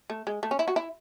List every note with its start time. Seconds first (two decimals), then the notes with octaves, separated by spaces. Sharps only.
0.10 A3
0.27 G#3
0.43 A3
0.51 C#4
0.59 E4
0.68 F#4
0.76 E4